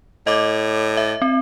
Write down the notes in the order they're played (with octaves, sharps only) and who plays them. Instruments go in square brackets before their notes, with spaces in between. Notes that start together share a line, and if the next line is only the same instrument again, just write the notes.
[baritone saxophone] A2 [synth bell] D#5 D6
[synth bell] E5
C4